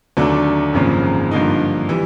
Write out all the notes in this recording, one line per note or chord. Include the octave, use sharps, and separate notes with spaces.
D#2 D3 F#3 A3 D4
G#1 F#2 C#3 F3 A#3
G2 D3 F3 A#3 D#4
E3 G3